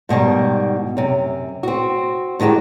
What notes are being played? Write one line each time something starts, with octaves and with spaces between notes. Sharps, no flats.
G#2 B2 D#3 G3
F#2 C3
C4 F#4
A2 D#3 G#3 F#4 G4